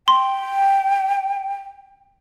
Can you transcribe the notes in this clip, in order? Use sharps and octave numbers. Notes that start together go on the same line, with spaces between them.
G5 C6